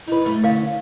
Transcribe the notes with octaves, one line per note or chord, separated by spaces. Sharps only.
D#4 E4 B4
F#2 A3
D3 C#4 A#4 C#5 F5